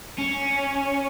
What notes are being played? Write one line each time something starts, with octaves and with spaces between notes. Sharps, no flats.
C#4